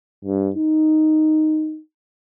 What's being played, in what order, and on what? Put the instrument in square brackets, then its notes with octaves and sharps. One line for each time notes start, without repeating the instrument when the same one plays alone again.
[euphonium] G2
D#4